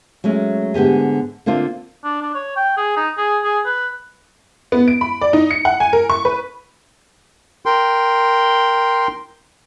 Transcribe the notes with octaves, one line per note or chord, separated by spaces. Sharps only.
F#3 G#3 A3 C#4
G#2 D3 B3 G4 G#4
D3 A#3 C4 D4 F4
D4
D4
C#5
G5
G#4
D#4
G#4
G#4
B4
B3
D7
B5
D5
D#4
C#7
F#5
G#5
A#4
C#6
B4
A#4 G5 C6